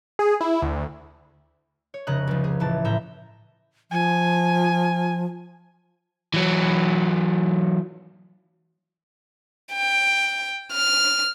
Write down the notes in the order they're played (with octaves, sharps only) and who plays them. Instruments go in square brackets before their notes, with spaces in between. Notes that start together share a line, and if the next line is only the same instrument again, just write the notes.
[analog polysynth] G#4
E4
D2
[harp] C#5
F1 C#3 D#5 A#5 F#6
C#2 F3
G#4
A1 E3 A5
A2 E5 A#5 G6
[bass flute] F3 [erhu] G#5
[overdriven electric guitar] E3 F#3
[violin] G5
F6